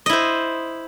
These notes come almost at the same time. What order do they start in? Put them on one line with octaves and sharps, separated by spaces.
D#5 E4 C5